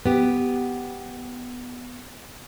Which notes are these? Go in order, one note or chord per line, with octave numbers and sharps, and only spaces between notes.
B3 G4